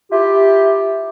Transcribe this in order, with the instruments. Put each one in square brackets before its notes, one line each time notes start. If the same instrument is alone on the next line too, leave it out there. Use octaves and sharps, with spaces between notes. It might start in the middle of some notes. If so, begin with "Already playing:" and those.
[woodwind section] E4 F4 G4